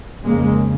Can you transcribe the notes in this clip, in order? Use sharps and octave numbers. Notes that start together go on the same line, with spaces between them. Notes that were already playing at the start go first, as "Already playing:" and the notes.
F2 C#3 G#3 A#3